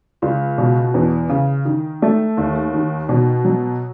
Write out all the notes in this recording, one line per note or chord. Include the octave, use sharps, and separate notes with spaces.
C#2
B2
E2
C#3
D#3
A3
D#2
D#3
B2
F#3